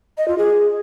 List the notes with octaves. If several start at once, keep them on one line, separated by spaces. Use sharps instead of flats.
D#5
F4
G#4